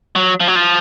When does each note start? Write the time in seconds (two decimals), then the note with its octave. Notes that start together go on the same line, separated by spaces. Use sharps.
0.16 F#3
0.40 F3
0.48 F#3
0.56 F3